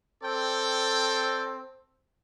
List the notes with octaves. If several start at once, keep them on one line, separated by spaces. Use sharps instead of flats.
C4 A4 D5 G5